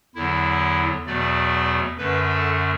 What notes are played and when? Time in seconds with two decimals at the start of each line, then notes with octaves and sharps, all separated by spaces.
0.15 E2 D3 F#3 E4
1.06 E2 B2 F#3 A3 D5
1.98 F#2 D3 A3 B4
2.29 A4